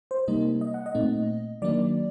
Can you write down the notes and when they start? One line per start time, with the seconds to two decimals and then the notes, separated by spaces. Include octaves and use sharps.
0.11 C5
0.28 C3 G3 A#3 D#4 D#5
0.61 D#5
0.74 F#5
0.86 D#5
0.95 A#2 A3 C4 D#4
1.62 D#3 F#3 A#3 D4 D5